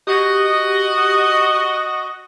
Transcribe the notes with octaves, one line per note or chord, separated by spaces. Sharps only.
F#4 G4 D#5